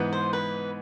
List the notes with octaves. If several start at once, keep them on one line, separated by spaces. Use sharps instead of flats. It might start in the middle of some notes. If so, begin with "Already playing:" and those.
Already playing: G#2 E3 B3
C5
B4